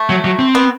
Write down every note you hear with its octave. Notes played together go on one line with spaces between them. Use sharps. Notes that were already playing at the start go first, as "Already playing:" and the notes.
Already playing: A3
F#3
F#3
C4
B3